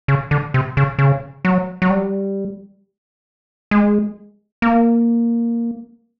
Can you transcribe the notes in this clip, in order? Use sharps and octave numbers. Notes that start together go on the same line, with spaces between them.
C#3
D3
C3
C#3
C#3
F#3
F#3
G3
G#3
A#3